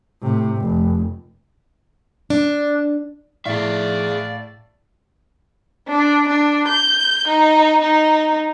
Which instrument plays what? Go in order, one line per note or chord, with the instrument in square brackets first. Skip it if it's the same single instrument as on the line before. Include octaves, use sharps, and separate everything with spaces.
[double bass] A2 C3
F1
[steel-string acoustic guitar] D4
[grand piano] A2 [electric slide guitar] G#4 E5 [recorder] D5 [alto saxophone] F5
[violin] D4
D4
G6
D#4
D#4